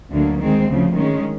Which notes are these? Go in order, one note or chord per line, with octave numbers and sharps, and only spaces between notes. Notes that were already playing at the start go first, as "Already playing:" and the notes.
D2 D3 F#3 A#3
D#3 G#3 C4
D2 C#3 F3
D#3 G#3 C#4